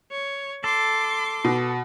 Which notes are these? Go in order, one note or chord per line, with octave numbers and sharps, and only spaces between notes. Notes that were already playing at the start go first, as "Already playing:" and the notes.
C#5
A4 C6 D6
B2